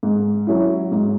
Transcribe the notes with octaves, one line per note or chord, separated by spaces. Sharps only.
G#2
F#3 C#4 E4
G#2